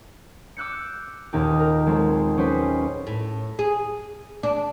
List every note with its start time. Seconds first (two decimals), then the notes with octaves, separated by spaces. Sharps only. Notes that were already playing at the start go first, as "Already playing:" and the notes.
0.57 D6 E6 F#6 G6 C#7
1.33 D#1 D#2 D#4 G4
1.59 A#4
1.86 F#3 G#3 C4 A4
2.37 F#3 C#4 G4 G#4 B4 C5
3.07 A2
3.59 G#4
4.43 D4